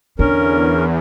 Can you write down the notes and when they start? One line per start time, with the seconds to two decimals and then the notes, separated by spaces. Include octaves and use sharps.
0.19 E2 D3 B3 C#4 A#4